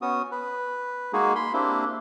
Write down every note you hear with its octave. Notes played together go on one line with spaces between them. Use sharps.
B3 C#4 F#4 D#6
B4
G#3 A#3 D#4 F#4 G#4
B5 C6
A#3 C4 D4 E4 G4